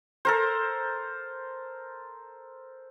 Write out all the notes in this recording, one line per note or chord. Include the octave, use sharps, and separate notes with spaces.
A4 A#4 C5